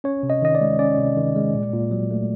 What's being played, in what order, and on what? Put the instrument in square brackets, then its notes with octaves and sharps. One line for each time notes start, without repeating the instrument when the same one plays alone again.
[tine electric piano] C#4 C#5
C3
D#5
D#3 D#5
D5
G#3
C#4 D5
C3
D#3
G#3
A#2
A#2
F#3
A3